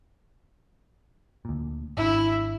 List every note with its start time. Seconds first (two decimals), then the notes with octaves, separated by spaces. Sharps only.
1.45 D2 A#2
1.97 G#1 D3 D4 E4